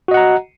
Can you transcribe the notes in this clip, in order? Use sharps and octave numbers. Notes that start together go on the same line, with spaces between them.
F#4 D#5 F#5 A#5